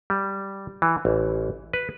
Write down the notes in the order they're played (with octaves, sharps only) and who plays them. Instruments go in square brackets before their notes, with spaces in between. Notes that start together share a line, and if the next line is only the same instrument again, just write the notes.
[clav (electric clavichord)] G3
E3
A1
B4